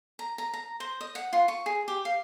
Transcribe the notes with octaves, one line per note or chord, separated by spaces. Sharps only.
A#5
A#5
A#5
C5
D#5
F#5
F4
C#6
G#4
G4
F5